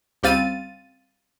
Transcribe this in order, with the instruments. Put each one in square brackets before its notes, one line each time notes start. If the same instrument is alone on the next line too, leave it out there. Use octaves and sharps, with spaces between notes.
[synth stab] C#2 G3 C4 F5 A6 D#7